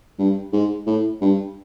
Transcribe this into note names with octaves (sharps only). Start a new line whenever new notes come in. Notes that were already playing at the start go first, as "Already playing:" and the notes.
G2
G#2
A2
G2